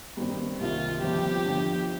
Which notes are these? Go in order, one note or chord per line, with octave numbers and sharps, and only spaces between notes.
G2 D#3 G3 C4
C2 C3 D#3 F4
G1 G2 F3 C4 G4
G1 F2 D3